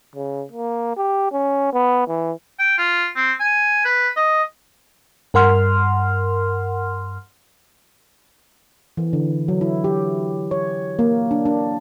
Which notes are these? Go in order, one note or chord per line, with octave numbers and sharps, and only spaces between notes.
C#3
A#3
G4
C#4
B3
E3
G5
F4
C4
G#5
B4
D#5
G2 A#4 F#5 C6 F6
E3
D3
F#3
E4
G4
C#5
A#3
D4
D4